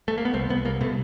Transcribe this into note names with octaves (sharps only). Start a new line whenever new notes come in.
A3
A#3
B3
C2 C4
C2 B3
C2 A#3
B2 A3